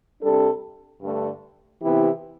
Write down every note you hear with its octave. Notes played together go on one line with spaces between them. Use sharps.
C3 G3 D4 A4
G2 D3 A3
C3 E3 B3 E4 G4